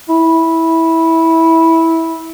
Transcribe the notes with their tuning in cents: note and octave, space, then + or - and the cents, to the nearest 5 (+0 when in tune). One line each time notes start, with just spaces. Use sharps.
E4 -15